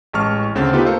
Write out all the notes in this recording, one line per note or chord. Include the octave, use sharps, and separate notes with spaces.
A1 G#3 A5 C#6 F6
D2 C#3 C4 A6
B3 D#4 F4 G4 A4 B4
A3 A#3 A4 C5 F5